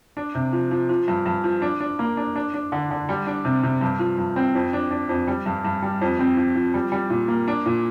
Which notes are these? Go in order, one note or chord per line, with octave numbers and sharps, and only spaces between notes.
D4
C3
F3
F3
F3
G2
G2
F3
D4
D4
A#3
D4
D4
D4
D3
D3
G3
D4
C3
C3
G2
F3
G2
C4
F2
D4
D4
F2
G3
G2
G2
G3
F2
C4
F3
F3
G3
G3
A#2
A#3
D4
A#2